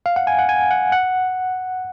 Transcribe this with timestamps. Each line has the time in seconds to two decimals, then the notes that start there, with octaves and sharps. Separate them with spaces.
0.06 F5
0.16 F#5
0.27 G#5
0.39 F#5
0.49 G#5
0.71 F#5
0.92 F#5